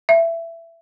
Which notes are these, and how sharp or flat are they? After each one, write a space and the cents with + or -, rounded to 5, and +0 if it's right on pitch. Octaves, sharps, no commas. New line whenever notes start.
E5 +20